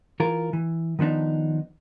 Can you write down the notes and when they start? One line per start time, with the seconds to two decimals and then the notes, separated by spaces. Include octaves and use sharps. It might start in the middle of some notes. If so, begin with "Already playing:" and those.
0.20 E3 F4 A#4
0.53 E3
0.99 D#3 F3 B3 D4 D#4